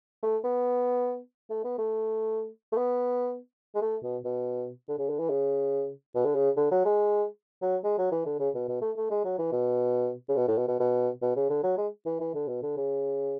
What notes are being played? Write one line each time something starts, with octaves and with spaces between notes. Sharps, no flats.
A3
B3
A3
B3
A3
A3
B3
G#3
A3
B2
B2
D3
C#3
D3
E3
C#3
B2
D3
C#3
D3
F#3
G#3
F#3
G#3
F#3
E3
D3
C#3
B2
B2
A3
A3
G#3
F#3
E3
B2
C#3
B2
A2
B2
B2
B2
B2
C#3
D3
F#3
G#3
E3
E3
D3
B2
D3
C#3